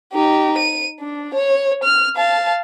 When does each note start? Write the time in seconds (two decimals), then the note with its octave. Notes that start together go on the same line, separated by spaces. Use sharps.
0.13 D#4 G4
0.58 D#7
1.00 D4
1.35 C#5
1.84 F6
2.16 F5 A5